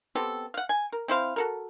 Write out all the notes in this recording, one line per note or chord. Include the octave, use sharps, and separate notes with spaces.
B3 C4 G4 A4
F5 F#5
G#5
A#4
C4 E4 C5 F5
F#4 A4 A#4